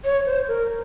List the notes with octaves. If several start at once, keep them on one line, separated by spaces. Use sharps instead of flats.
C#5
C5
A#4